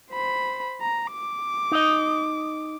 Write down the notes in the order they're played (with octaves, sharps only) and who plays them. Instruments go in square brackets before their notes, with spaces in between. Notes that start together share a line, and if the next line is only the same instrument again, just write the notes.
[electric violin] C5 B5
A#5
D6
[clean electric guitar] D#4 D#5